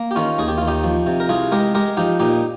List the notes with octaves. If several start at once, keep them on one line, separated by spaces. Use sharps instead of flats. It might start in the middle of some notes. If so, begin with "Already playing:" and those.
Already playing: A#3
G4
D#3 C#4 F4
D#2 G#4
G4
D#2 F4
D#4 G4
F3
C3
A#4
C2 F4 G#4
G#3 G4 A#4
G#3 G4 A#4
F3 D#4 G4
A#2 D#4 G4